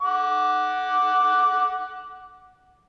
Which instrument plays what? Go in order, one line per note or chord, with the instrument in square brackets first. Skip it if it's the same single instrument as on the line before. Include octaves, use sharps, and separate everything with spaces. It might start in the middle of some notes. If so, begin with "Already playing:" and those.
[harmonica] F#5 D6